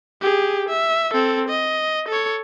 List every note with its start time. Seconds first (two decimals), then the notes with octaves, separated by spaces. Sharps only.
0.21 G4 G#4
0.69 E5
1.13 C4 A4
1.49 D#5
2.08 A4 C#5